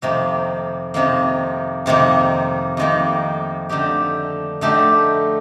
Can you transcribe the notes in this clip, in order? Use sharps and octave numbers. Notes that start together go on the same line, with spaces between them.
F2 C3 D#3 A#3
F2 C3 D#3 A#3
F2 C3 D#3 A#3
F2 C3 D#3 A#3
D3 A3 D#4 G4
D3 A3 D#4 G4